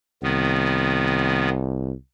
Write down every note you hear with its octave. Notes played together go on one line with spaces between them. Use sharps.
C2 D#3 B3